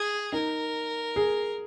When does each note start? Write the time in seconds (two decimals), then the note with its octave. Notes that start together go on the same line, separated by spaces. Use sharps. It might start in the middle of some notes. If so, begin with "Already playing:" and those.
Already playing: G#4
0.33 D#4 A#4
1.16 G#4